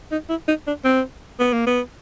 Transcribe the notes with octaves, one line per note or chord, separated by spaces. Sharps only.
D#4
E4
D#4
D4
C4
B3
A#3
B3